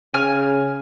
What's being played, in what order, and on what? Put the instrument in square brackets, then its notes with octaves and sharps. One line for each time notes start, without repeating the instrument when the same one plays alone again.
[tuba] C#3 [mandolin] G#5 F6